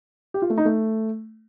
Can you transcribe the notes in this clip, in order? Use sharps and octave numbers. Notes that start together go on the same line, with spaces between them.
G4
F4
A3
D#4
A3